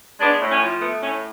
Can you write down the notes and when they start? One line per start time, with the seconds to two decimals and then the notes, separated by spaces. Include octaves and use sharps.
0.20 G#3 B3 D4
0.41 A2
0.51 C#4
0.62 F3
0.81 A3 B3
1.02 A2 C#4